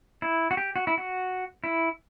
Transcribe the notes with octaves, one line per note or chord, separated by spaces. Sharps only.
E4
F#4
G4
F#4
E4
F#4
E4